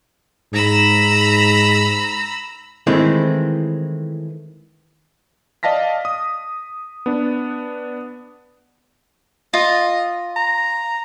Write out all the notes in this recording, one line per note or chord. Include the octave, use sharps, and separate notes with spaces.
G#2 A#5 B5 E6
D#3 E3 G#3 A3 C4 E4
D5 D#5 F5 A5 A#6 B6
D#6
B3 D4
F4 D#5
A#5